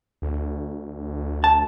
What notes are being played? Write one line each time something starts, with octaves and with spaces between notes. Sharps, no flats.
D2
A5